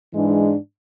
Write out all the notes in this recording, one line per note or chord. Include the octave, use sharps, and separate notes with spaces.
G#2 E3 G#3 D4